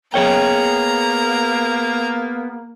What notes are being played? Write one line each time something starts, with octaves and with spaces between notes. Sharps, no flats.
A#3 B3 G#4 C#5 G5 A#5